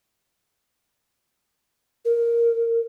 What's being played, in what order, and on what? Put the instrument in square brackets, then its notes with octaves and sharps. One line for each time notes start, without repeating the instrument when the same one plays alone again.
[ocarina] A#4